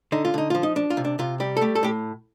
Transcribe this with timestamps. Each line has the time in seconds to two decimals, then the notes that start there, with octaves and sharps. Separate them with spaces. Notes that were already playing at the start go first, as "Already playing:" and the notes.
0.12 D3 D#4
0.25 F4
0.34 D3 D#4
0.50 F3 F4
0.63 D#4
0.76 D4
0.90 F4
0.97 C3
1.05 D4
1.19 C3 F4
1.40 G3 G4
1.57 A4
1.61 A3 G4
1.75 A4
1.83 A2 G4